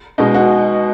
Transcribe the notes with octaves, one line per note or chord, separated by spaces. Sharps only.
B2 G#3 D#4
F#4